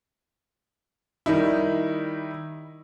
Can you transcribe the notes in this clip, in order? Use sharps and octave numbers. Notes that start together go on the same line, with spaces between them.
D#3 G3 D#4 E4